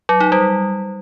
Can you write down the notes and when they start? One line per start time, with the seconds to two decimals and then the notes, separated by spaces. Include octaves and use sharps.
0.09 F#3
0.20 D#4
0.32 G3